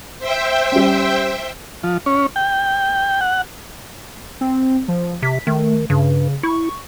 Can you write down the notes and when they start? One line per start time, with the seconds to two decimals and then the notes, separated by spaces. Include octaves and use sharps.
0.19 C5 E5 G5
0.72 G3 C#4
1.83 F3
2.06 C#4
2.36 G5
3.21 F#5
4.41 C4
4.88 F3
5.22 C3 B6
5.47 D#3 A3
5.90 G2 C#3
6.43 E4 C#6